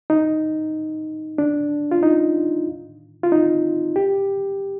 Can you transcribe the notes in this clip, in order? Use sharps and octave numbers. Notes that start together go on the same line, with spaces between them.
D#4
D4
F4
D#4
F4
D#4
G4